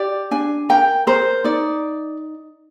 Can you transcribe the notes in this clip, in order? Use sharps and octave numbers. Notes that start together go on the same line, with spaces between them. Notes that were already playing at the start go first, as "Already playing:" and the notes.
Already playing: G4 D5
D4 G#5
A#4 G5
A#4 C5
D#4 D5